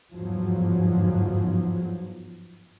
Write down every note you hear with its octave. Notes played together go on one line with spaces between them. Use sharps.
G1 E2 G#2 F3 F#3